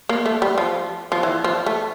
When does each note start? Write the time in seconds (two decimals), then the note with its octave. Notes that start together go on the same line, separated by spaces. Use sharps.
0.09 A#3
0.26 A3
0.42 G3
0.58 F3
1.12 F3
1.23 E3
1.44 F3
1.66 A3